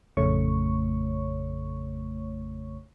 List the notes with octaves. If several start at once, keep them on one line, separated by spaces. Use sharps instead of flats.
A1 F2 C#3 A3 C#5 C#6